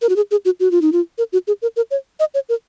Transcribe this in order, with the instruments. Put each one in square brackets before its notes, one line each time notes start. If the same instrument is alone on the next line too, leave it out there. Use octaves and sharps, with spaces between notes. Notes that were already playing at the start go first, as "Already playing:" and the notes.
[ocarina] A#4
F#4
G#4
G#4
F#4
F#4
F4
D#4
F4
A#4
F#4
G#4
A#4
A#4
C#5
D#5
C#5
A#4